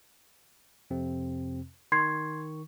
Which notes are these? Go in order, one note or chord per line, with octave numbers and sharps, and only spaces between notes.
F2 C3 C4
D#3 C6 C#6 G#6 C7